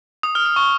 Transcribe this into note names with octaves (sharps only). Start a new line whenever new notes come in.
D#6
F6
D#6
C#6